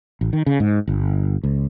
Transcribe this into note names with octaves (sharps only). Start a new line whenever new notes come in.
A1
D#3
C#3
G#2
G1
C#2